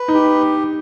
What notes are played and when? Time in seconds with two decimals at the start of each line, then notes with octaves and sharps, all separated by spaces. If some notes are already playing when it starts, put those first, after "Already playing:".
Already playing: B4
0.08 D#4
0.14 G4